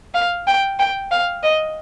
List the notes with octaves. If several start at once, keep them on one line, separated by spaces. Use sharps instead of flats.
F5
G5
G5
F5
D#5